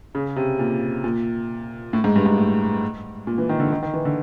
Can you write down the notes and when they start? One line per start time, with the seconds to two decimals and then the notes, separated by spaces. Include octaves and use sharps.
0.15 C#3
0.36 C3
0.59 A#2
1.04 A#2
1.93 A2
2.04 G#2
2.16 G2
2.26 G#2
2.38 A2
3.27 A#2
3.38 E3
3.49 D#3
3.60 D3
3.72 D#3
3.82 D#3
3.94 E3
4.05 D3